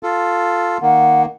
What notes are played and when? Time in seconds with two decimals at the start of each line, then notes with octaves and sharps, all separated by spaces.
0.03 F4 A4
0.82 D#3 A#3 F#5